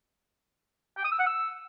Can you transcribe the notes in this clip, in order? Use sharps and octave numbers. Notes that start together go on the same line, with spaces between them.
G5
D#6
E6
F#5
E6